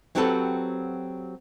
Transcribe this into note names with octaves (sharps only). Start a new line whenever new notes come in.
F#3 C4 F#4 G4 A4 B4